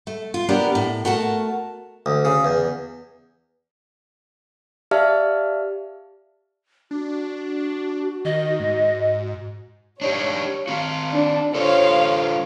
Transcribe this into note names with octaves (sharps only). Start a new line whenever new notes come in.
A3
F4
B3 D4 G4 A#4
A2
A3 F#4 A#4 A5
D2
C#3
E2
G4 D5 E5 F5 A5 F6
D4 F#4
D#3 D#5
G#2
D4 D#4 G4 C#5
C4 F#4 F5
D4
D3 F4 A4 C5 C#5 F5